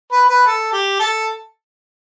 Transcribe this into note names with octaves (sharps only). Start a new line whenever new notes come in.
B4
B4
A4
G4
A4